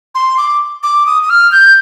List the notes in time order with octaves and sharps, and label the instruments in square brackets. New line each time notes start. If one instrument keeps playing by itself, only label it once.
[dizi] C6
D6
D6
D#6
D#6
F6
G6